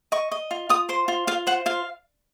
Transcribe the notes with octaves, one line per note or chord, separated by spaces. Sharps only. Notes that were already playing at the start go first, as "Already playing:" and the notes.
D#5 C#6
D#5
F4
F4 D#6
C5 C6
F4
F4 F5
C5 F#5
F4 F5